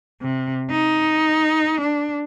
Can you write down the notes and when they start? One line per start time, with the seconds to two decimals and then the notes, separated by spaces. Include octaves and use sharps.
0.22 C3
0.71 D#4
1.81 D4